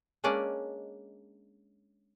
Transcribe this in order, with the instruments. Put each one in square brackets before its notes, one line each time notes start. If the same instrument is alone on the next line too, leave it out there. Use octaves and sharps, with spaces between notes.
[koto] G#3 A#3 C#4 D4 D5 D#5